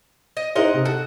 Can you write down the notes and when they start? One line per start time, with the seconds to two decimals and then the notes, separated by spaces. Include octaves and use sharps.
0.37 D#5
0.55 D#4 G#4 A#4 C5 D#5 F#5
0.74 C3
0.85 F#4 A4